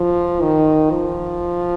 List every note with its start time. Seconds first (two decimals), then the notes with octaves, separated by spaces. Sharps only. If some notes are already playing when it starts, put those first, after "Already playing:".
Already playing: F3
0.41 D#3
0.90 F3